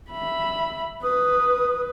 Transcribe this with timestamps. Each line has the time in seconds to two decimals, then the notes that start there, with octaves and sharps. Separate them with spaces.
0.11 E5 B5
1.03 B4 D#6